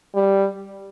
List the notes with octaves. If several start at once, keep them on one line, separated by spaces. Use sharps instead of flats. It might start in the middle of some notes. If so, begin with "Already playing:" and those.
G3